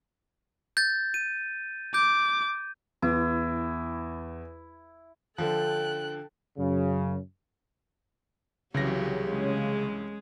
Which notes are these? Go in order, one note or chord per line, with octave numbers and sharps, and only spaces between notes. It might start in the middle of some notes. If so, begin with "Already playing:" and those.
G6 A6
D#7
D6 G6
E2 E4
D3 F3 A4 G5 F#6
F#2 C#3
C2 C#3 E3 F#3 F#4 G4 A#6
G#3 C#4